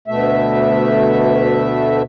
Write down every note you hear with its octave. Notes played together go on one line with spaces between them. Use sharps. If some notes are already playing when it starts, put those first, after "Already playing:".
D2 B2 A3 E5